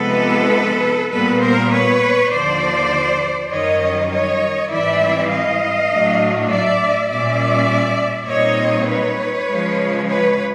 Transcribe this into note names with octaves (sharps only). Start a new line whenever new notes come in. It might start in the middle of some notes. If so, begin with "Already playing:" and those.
Already playing: C3 F3 G#3 B3 D#4 A4 B4
A#2 G3 B3 A4 B4
A#4 C5
B4 C#5
D#2 D3 F3 C5 D5
F#2 D#3 G3 C#5 D#5
C#5 D#5
G#2 E3 G3 C4 E4 D5 E5
D#5 F5
A2 F#3 A3 D4
D5 E5
A#2 G3 A#3 C#4 D5 E5
A#2 G3 C4 D#4 C#5 D#5
B4 C#5
C#3 F3 G#3
B4 C#5